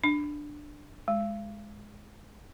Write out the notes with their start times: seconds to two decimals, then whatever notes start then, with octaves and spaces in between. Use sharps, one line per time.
0.04 D4
1.08 G#3